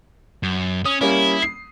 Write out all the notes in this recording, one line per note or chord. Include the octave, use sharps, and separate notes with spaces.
F#2
C#4 D#6
G3 A#3 C#4 E4
C7